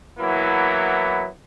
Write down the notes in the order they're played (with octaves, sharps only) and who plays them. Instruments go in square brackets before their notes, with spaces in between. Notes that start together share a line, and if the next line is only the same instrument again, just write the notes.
[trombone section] E3 F#3 A#3 B3 E4